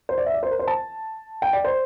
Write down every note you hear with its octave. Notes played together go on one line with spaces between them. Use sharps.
C5
D5
E5
D5
C5
A#4
C5
A5
G5
D5
C5